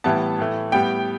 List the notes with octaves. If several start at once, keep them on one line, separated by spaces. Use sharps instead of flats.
A2 E3 G3 B3 A5
A2 E3 A3
A2 G3 B3 G5